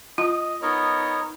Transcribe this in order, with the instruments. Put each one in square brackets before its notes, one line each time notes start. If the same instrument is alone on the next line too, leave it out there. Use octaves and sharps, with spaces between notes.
[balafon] F4 [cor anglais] D#5
[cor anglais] B3 [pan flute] D#4 [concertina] A#4 C#5 D#5